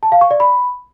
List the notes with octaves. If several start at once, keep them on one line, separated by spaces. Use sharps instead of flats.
A5
F5
C#6
D5
B5